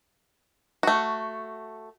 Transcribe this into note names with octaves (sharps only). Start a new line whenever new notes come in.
A3 F#4